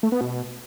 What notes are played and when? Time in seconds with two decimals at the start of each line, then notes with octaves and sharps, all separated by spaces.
0.03 A3
0.12 B3
0.21 B2